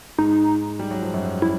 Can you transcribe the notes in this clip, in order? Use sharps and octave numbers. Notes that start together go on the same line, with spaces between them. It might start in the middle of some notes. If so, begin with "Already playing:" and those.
G#2 G#3 D#4
G3
F#3
F3
F#2 F#3
E4